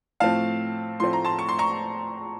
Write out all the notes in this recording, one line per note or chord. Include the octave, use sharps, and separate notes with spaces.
A2 F3 A3 C4 F5 A5
A2 F3 A3 C4 C6
A#5
A5 C6
C#6
C6
A#5 C#6